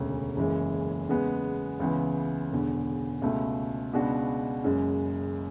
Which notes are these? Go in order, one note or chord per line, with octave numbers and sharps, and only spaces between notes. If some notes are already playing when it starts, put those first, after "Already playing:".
Already playing: E1 D2 C#3
F#1 F#2 C#3 E3 G#3
E2 C#3 G#3 B3
C#2 C#3 E3 B3
E1 E2 D3
C#2 B2 A3
C#2 B2 G#3 D4 F#4
F#1 F#2 C#3 G#3